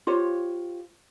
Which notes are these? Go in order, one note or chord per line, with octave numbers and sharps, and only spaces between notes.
F4 G4 C5 C#5